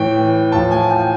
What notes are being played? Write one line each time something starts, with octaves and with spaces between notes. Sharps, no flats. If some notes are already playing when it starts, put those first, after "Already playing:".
Already playing: A2 E3 G5
A2 F3 A5
G#5
G5